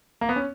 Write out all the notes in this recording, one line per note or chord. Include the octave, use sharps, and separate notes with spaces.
A#3
B3
C#4